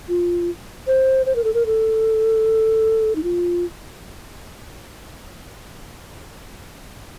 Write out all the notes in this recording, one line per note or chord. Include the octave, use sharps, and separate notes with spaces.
F4
C5
C5
A#4
A4
A#4
A4
D#4
F4